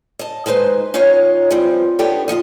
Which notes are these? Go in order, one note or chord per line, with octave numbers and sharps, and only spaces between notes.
D#5 A5
D#3 G#3 D#4 B4 C5
C#4 D#4 F4 A#4 C#5 D#5
E3 F3 G3 C4
B3 D4 D#4 G4 A4 C#5
D#2 B2 F3 D#5